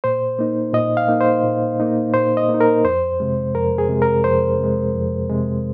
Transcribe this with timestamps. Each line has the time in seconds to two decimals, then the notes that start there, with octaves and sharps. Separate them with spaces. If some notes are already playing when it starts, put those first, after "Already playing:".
0.04 A#2 C5
0.39 A#3 D#4
0.73 A#2 D#5
0.97 F5
1.09 A#3 D#4
1.20 C5
1.44 A#2
1.80 A#3 D#4
2.14 A#2 C5
2.37 D#5
2.49 A#3
2.54 D#4
2.61 A#4
2.84 F2 C5
3.20 C3 G#3
3.55 F2 A#4
3.78 G#4
3.89 C3 G#3
4.02 A#4
4.24 F2 C5
4.59 C3 G#3
4.95 F2
5.30 C3 G#3